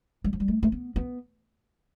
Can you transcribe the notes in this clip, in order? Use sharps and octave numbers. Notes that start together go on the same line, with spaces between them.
G3
F3
G3
A3
A3
B3
B3